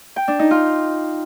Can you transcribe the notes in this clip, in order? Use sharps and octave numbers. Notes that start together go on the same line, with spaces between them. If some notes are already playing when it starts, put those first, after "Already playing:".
G5
D4
D#4
F4